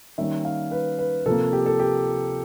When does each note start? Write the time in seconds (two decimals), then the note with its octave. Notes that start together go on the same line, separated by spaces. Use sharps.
0.18 D#3 G3 A#3 C#4 E5
0.45 F5
0.71 B4
0.99 B4
1.26 C3 F3 A#3 A4
1.53 G4
1.66 A4
1.79 G4